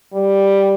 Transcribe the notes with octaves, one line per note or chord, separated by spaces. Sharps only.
G3